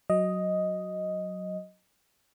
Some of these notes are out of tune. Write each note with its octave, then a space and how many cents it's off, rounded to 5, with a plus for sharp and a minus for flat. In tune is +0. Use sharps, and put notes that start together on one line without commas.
F#3 +0 D#5 +5